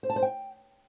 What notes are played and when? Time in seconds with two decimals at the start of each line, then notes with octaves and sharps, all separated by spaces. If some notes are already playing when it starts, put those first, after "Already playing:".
0.03 C5
0.10 A5
0.16 C5
0.23 G5